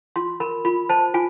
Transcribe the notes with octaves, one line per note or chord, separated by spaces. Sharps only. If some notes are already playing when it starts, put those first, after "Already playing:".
F4 C6
A#4 B5
F4 B5
C5 A5
F4 G#5